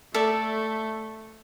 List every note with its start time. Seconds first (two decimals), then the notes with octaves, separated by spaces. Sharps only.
0.14 A3 A4 D5 E5